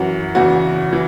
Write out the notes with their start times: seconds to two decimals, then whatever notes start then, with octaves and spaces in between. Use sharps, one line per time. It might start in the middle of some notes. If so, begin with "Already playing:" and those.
Already playing: F#2 E3 F#4
0.35 E2 C#3 E3 F#4
0.93 E3